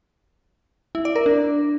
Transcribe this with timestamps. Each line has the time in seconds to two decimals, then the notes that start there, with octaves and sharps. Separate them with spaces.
0.95 E4
1.05 D5
1.16 A#4
1.26 D4